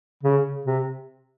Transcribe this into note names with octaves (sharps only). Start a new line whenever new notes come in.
C#3
C3